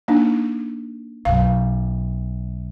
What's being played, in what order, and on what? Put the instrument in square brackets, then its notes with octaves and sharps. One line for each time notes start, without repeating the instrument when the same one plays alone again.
[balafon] A#3 D4 D#4
[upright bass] B1 F#2 [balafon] F5